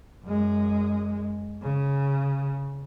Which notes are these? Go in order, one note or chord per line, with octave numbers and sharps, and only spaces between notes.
F#2 G#3
C#3